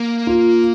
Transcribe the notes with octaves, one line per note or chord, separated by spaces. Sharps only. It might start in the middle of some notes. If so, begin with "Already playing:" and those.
Already playing: A#3
F4